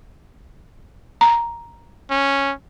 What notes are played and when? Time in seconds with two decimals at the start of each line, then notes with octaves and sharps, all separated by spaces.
1.21 A#5
2.10 C#4